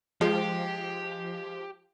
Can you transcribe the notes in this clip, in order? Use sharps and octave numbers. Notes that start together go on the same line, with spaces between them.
F3 G#3 G4